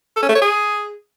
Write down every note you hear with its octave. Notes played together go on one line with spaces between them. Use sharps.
A4
C#4
A3
C#5
G#4